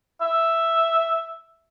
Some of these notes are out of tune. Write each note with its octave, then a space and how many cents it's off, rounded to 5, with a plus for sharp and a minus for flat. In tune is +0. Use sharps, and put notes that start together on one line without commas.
E5 +0